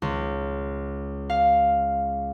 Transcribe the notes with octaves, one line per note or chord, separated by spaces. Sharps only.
C#2
F5